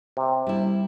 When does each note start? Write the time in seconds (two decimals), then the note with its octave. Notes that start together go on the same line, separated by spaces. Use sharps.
0.17 C3
0.47 G3 E4